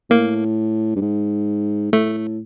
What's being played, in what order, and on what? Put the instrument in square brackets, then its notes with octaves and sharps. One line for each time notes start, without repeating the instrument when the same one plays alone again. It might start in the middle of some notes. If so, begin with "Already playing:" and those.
[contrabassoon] A2 [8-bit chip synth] A#3
[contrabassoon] G2
G#2
[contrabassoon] A2 [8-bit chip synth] A3